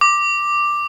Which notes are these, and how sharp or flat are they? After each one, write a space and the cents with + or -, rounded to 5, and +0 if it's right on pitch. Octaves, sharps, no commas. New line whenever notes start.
D6 +5